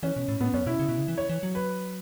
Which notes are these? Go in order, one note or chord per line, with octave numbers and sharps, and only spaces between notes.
E3 C#4
B2
A2
A2 B3
F#2 C#4
B2 E4
C#3
B2
C#3
E3
C#5
E3
F#3
B4